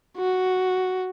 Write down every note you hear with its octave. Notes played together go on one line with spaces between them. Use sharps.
F#4